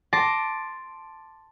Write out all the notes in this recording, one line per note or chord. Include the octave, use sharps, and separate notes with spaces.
A5 C6 D6 A#6